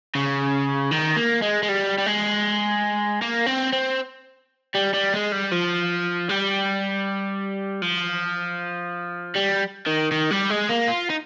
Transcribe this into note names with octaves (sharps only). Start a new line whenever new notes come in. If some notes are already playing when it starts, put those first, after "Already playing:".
C#3
D#3
A#3
G#3
G#3
G3
G3
G#3
A#3
C4
C4
G3
G3
G#3
G3
F3
G3
F3
G3
D#3
D#3
G3
G#3
A#3
F4
D#4